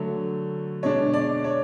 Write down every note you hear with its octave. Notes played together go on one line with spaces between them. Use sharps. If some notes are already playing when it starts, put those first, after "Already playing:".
Already playing: D3 F#3 A3
B2 G#3 D4 C#5
D5
C#5